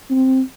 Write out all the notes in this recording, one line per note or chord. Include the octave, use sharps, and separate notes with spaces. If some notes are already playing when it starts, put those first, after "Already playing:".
C4